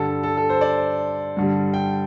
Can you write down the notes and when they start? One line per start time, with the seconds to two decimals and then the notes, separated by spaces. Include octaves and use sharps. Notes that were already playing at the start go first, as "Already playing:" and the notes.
Already playing: G2 D3 G3 A4
0.23 A4
0.37 A4
0.49 C5
0.61 D5
1.37 G2 D3 G3
1.74 G5